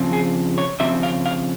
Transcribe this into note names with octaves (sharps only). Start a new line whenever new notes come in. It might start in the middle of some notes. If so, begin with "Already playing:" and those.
Already playing: C#3 F3 C4
G#4
C#5
C#3 F3 C4 E5
F5
F5